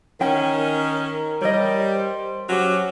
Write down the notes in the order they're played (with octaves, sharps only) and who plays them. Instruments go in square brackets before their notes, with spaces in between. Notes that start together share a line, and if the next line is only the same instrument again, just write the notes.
[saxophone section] D#3 C#4 [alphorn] A#4 [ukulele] G5
[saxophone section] G3 [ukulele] C#5 D#5
[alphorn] C5
[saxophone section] F#3 C#4 G4